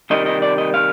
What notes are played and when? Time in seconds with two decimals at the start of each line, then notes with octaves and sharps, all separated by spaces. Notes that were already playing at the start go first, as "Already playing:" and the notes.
0.10 C3 D#3 G3 D#5
0.26 D#5
0.42 D5
0.58 D#5
0.74 F5